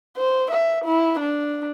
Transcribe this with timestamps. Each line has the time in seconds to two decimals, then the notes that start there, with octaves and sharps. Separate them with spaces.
0.17 C5
0.51 E5
0.84 E4
1.20 D4